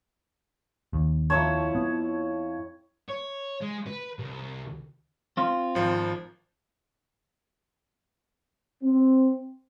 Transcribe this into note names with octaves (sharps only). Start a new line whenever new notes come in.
D#2
F2 E4 C#5 A5
B3
C#5
G#3
B4
C2
C4 F4
G#1 F3
C4